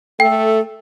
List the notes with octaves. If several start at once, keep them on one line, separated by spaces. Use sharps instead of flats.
A3 A4 G5